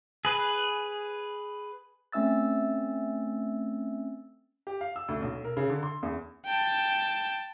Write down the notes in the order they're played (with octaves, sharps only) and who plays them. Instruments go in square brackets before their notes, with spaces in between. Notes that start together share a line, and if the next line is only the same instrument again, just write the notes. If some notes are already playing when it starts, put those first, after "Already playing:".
[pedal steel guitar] G#4 B4
[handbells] A3 C4 C#4 E5 E6 A6
[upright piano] G4
F5
E6
D2
B1
A#4
C#3
D3
C6
E2
[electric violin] G5 A5